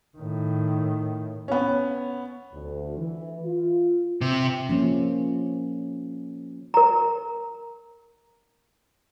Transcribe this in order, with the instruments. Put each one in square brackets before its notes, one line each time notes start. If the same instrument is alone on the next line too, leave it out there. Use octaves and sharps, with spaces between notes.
[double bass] A2 D#3
[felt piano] B3 C#4
[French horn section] D2
E3
F4
[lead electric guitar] C3
[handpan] F3 A#3 C#4
[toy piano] A#4 A#5